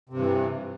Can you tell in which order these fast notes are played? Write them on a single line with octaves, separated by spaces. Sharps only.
C3 G2 E3